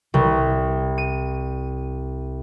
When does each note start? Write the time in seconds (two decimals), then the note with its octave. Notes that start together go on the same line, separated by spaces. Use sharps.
0.14 C2
0.98 D#7